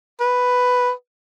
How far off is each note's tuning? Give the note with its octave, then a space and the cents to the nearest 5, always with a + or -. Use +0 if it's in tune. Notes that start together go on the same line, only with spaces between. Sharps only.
B4 +5